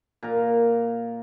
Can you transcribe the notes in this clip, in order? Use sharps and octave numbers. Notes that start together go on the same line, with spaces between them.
A#2 A#4 A#5